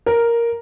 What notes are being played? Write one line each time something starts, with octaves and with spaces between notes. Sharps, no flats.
A#4